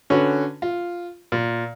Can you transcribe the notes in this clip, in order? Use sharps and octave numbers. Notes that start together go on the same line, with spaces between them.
D3 C#4 F#4 B4
F4
A#2